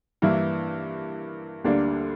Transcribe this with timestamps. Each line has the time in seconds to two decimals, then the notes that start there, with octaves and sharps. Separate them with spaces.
0.22 G2 E3 A#3 E4
1.64 D2 D3 G3 A#3 D4